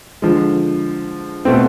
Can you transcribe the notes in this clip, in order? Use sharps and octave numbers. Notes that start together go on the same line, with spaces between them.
D3 F3 G#3
B2 A3 C4